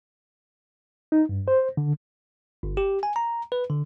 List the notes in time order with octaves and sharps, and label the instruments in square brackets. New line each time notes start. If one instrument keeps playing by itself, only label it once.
[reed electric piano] D#4
G2
C5
D3
[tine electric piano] G1
G4
G#5
A#5
B4
D3